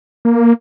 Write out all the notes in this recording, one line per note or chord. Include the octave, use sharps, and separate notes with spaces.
A#3